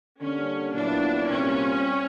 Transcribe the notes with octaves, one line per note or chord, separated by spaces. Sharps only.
D3 G3 A#3 C#4
A#2 F#3 B3 D4 E4
C2 A#2 G3 C4 C#4